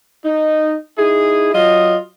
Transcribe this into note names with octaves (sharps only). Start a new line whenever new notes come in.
D#4
D#4 E4 G#4
F#3 F4 D#5